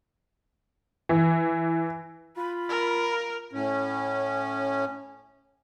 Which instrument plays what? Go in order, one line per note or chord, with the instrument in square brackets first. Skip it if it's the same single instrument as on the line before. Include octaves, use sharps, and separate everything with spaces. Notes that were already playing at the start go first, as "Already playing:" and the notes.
[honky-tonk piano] E3
[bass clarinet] F4 [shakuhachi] B5
[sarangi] A#4
[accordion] A2 C#4